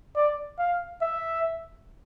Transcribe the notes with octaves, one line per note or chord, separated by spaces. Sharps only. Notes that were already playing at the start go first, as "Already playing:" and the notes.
D5
F5
E5